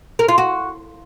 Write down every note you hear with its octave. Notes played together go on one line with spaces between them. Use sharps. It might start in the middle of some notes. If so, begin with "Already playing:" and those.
A#4
F4
F#4